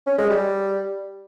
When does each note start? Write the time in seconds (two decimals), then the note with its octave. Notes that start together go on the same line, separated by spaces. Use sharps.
0.07 C#4
0.18 G#3
0.30 G3